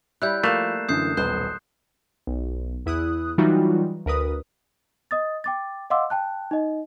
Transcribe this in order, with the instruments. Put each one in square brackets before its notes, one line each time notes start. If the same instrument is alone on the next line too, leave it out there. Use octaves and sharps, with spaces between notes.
[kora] G3 E4 [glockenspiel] F#6 G6
[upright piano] F3 F5 [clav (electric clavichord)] A3 [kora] A#3 [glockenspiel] F#6 C7 E7
[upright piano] F#2 D3 E3 [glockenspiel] D#6 G6 C7
[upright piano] D#1 B1 B4 [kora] C5 [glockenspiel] F#6
[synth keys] B1
E2 E4 D#6 F#6
E3 F#3 G3 D#4 F4 F#4
D2 A#4 B4 D#6
[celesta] D#5 D#6 A6
G5 D6 A6
D#5 F5 F#5 C6 D6 E6
G5 A5 F#6
D#4 D#5